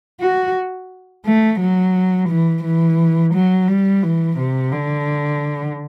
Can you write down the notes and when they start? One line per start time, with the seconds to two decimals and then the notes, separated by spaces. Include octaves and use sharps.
0.21 F#4
1.26 A3
1.60 F#3
2.29 E3
2.64 E3
3.34 F#3
3.68 G3
4.03 E3
4.39 C3
4.73 D3